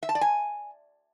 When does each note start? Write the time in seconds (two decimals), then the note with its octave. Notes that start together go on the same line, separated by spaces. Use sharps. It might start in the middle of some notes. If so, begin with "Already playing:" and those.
0.03 E5
0.09 A5
0.15 D5
0.21 G#5